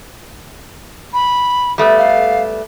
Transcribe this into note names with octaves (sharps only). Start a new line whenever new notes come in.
B5
G3 A3 B3
F5